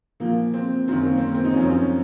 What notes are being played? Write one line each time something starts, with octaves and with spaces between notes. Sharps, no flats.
A#2 F3 A#3
C4
F#2 D#3 C4
A#3
C4
A#3
C4
D#4
C#4
F#2 F3 C4
C#4